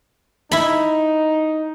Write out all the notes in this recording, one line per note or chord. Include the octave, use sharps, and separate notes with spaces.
D#4 E4 B5